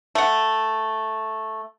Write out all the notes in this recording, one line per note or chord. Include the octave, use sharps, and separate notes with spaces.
A3 F#5